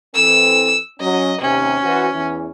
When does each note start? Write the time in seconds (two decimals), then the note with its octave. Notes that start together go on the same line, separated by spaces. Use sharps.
0.15 E3 C4 A4 E6
1.00 F#3 C#4 D#5
1.41 D#2 C3 C#4
1.83 E3 F#4 C5
2.14 E2 E3